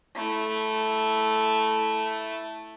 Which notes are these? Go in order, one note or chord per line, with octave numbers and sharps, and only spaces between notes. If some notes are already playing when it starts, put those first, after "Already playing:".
A3 E4